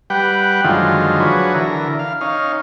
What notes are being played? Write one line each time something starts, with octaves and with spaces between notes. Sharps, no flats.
G3 B4 F#5 G5
F#2 D3 D#3 F3 G#3 F4
F#3 D4 G#4 B4 C#5
D3 E3 A#4
F5
C#4 D#4 F5